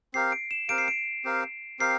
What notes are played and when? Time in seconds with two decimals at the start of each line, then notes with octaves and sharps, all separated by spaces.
0.14 C4 G4 A#4 F5 C7
0.32 D7
0.51 E7
0.69 C4 G4 A#4 F5 D7
0.78 C7
0.88 D7
1.24 C4 G4 A#4 F5
1.79 C4 G4 A#4 F5 C7